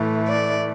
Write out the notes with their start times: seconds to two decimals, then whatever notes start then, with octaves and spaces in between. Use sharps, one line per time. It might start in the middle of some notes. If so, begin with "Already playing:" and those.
Already playing: A2 E3 A3
0.27 D5